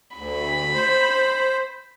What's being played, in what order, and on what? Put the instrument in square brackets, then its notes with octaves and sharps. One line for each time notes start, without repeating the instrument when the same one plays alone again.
[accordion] D2 [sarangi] B5
[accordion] C5